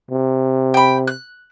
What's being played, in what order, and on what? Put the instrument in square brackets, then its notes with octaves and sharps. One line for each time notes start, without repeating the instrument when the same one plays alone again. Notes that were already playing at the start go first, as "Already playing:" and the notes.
[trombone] C3
[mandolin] G5 B5
F#6